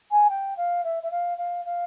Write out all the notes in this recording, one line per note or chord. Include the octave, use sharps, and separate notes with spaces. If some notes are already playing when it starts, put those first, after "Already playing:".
G#5
G5
F5
E5
E5
F5
F5
F5